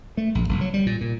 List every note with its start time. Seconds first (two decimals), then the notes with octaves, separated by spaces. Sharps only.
0.17 A3
0.35 A#1
0.49 F#1
0.61 F#3
0.74 G3
0.86 A#2
1.01 A#2